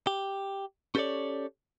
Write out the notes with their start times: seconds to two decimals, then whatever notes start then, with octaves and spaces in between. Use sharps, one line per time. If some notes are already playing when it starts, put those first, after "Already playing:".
0.07 G4
0.95 C#4 G4 A4 B4 C#5 D5